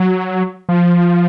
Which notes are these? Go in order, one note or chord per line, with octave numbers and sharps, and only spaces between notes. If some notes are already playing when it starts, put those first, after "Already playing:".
Already playing: F#3
F3